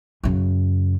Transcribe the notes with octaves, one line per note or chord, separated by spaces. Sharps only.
F#2 C#3